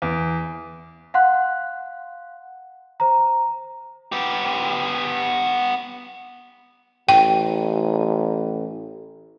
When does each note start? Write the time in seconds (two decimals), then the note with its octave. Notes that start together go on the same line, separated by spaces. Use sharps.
0.02 E2
1.14 F5 F#5 C6 F#6
3.00 C5 A#5
4.12 B3 G4
7.09 A1 G5